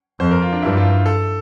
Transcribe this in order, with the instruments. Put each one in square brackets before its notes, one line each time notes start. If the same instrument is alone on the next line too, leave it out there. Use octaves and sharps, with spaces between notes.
[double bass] F2 [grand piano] C5
[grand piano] A#4
F4
D4
[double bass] G2 [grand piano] E4
[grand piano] F4
A4